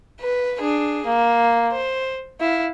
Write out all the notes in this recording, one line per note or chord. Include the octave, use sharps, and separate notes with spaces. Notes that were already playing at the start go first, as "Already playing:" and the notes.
B4
D4 G#4
A#3
C5
E4 F5